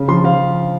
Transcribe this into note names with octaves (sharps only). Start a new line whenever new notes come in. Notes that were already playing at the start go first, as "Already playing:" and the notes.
Already playing: C#3
F3 C6
F3 F5